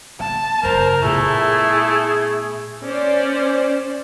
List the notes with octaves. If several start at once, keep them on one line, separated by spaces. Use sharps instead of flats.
B3 A5
F#1 F2 A#4 C5
A#2 A3 B3 E4 G#4
C#4 C5 D5